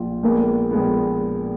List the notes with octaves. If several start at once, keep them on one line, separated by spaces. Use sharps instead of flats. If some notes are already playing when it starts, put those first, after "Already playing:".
Already playing: A#1 F4
A#1 A#2 G#3 B3 A#4
A#1 A#2 G#3 B3